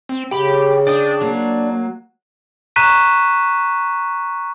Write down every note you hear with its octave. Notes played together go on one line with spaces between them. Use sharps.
C4
C#3 G4 G5 B5
D4 D5 G5 D#6
F#3 A#3
A#5 C#6 F#6 B6 D#7 E7